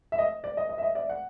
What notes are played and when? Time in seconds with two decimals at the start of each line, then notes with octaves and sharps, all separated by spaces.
0.12 E5
0.18 D#5
0.44 D5
0.57 D#5
0.69 D#5
0.78 E5
0.82 D#5
0.95 D5 E5
1.09 F#5